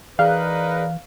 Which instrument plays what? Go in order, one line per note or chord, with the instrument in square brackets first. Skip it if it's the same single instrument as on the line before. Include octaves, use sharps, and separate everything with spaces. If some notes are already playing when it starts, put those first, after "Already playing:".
[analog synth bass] E3 [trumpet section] D#4 A#4 B4 [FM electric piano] G#4 D5 F#6 [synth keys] F5